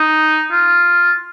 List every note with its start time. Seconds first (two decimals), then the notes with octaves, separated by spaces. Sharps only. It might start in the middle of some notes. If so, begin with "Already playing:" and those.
Already playing: D#4
0.51 F4